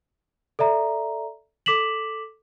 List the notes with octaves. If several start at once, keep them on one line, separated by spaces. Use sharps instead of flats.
A4 D5 E5 A#5
A4 D6 B6 E7 F#7